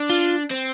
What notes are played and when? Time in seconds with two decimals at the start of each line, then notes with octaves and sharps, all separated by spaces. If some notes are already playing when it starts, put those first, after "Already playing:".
Already playing: D4
0.10 F4
0.51 C4